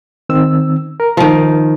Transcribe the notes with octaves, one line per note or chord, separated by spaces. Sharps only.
D#3 C4 E6
A#4
D#3 F3